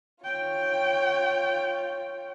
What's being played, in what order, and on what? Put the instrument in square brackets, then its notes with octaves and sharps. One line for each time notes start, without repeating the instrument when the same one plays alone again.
[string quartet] F4 C#5 [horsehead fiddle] G5